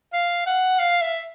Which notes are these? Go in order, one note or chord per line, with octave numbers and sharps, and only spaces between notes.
F5
F#5
F5
E5